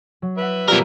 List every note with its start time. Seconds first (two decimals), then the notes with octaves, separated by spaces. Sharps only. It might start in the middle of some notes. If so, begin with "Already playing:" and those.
0.22 F#3
0.38 B4 E5 F#5 D7
0.68 B2 F3 G3 A#4